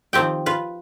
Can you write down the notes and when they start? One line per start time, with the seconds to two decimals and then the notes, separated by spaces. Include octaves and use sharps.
0.13 D#3 F3 C4 G4 G5
0.46 F4 B4